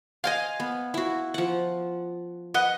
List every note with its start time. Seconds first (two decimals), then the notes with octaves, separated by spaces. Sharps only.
0.24 D#5 F5 G5 G#5 C6
0.60 B3
0.94 E4 F#4
1.34 F3 F#5
2.54 B4 D#5 F#5